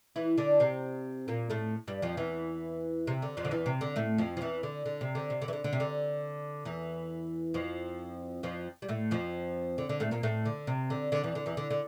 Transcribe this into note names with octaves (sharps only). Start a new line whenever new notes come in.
E3 E4
D3 D4
C3 C4
A#2 A#3
A2 A3
G2 G3
F2 F3
E2 E3
C3
D3
F2 F3
D3
E2 E3
C3
D3
A2 A3
F2 F3
F3
E2 E3
D3
D3
C3
D3
C3
D3
E3
D3
D3
C3
D3
E2 E3
F2 F3
F2 F3
G3
A2 A3
F2 F3
D3
D3
A2 A3
A#2 A#3
A2 A3
D3
C3
D3
D3
E2 E3
D3
E2 E3
D3
D3